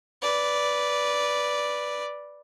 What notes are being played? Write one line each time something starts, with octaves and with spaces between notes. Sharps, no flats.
B4 D5